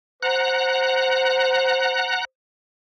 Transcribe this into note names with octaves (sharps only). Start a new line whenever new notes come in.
C5 F#5 A#5 F#6